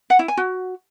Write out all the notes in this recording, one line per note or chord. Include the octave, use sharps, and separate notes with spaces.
F#5
E4
G#5
F#4